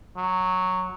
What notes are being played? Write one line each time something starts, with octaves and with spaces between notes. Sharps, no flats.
F#3